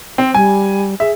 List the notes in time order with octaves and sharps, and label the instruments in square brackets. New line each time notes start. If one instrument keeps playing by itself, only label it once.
[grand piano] C4
[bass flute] G3 [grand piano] G#5
[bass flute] G#4 [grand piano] E5